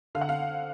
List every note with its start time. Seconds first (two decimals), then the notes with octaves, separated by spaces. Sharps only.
0.15 D3 F5
0.21 F#5
0.29 F5